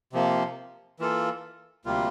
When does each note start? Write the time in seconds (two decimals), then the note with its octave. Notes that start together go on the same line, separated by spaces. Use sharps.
0.13 C3 F3 A#3
1.00 E3 A#3 F4 A4
1.85 D2 C3 G3 A#3 F4